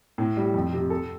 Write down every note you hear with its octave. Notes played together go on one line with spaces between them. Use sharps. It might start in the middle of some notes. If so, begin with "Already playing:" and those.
A2
G3
F2
C3
A4